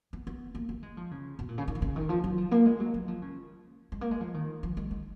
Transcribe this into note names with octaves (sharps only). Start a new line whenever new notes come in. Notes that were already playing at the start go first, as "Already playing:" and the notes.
B3
B3
A#3
A#3
G#3
F3
C#3
B2
A#2
C#3
D#3
B2
C#3
D#3
F3
F#3
F3
A#3
G#3
F#3
F#3
F3
C#3
G#3
A#3
G#3
F3
D#3
F3
G#3
G#3